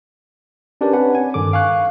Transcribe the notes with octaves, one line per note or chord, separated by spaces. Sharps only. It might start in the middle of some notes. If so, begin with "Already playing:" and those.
C#4 D4 G4 A#4 B4 D5
C4 D4 B4 C#5 F#5 G#5
G#5
G2 D#3 A4 D6
F5 G#5 C#6 F#6